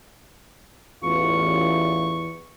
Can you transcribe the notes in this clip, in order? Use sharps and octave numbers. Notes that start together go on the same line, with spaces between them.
A1 E2 F4 C#6